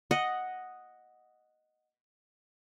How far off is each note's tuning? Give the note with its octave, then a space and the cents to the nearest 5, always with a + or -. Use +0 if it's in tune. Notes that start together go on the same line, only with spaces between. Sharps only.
D#5 +0 F#5 +0